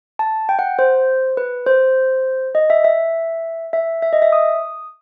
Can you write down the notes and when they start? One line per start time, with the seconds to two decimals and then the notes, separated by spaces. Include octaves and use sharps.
0.19 A5
0.49 G5
0.59 F#5
0.79 C5
1.37 B4
1.66 C5
2.55 D#5
2.70 E5
2.84 E5
3.73 E5
4.02 E5
4.13 D#5
4.22 E5
4.32 D#6